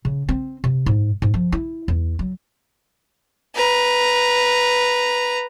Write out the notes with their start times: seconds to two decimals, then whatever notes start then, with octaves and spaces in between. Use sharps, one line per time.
0.05 C#3
0.29 C4
0.64 C3
0.86 G#2
1.22 G#2
1.34 F3
1.52 E4
1.88 E2
2.19 F#3
3.55 B4 A#5